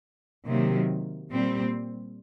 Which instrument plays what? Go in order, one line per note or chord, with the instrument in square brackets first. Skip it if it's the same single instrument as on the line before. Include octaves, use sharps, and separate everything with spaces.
[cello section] C3 D#3 F#3 A#3
A#2 G3 C4